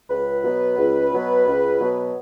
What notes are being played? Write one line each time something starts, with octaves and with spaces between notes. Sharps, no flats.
C#2 B4
B2 F#3 B3
C#2
B2 F#3 B3
C#2
B2 F#3 B3